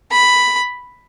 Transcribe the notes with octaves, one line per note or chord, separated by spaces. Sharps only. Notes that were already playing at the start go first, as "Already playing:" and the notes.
B5